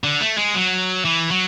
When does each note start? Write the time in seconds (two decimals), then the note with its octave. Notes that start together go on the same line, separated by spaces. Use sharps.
0.04 D3
0.21 A3
0.38 G#3
0.54 F#3
1.05 E3
1.31 F#3